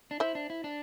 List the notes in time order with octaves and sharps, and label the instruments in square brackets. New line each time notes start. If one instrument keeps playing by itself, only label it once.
[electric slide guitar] D4
[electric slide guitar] E4 [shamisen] C5 E5
[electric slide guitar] D4
E4
D4